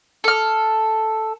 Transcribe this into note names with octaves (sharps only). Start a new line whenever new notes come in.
A4 F6